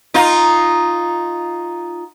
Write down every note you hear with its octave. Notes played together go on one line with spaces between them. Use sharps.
D#4 F4